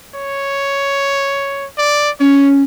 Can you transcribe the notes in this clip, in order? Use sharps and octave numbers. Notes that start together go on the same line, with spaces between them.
C#5
D5
C#4 C#5